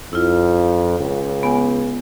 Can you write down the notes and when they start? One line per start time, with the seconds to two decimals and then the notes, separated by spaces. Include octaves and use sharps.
0.13 F2 E4 F4
1.00 C#2
1.43 B3 G#5